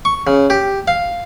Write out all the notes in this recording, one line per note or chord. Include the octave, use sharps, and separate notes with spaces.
C#6
C#3
G4
F5